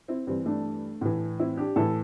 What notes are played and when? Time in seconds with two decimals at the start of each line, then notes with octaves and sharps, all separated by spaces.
0.08 C4 E4
0.27 G2 E3 C4
0.46 A3 D4
1.01 A2 E3
1.39 C4 E4
1.57 D4 G4
1.76 A2 E3 E4 A4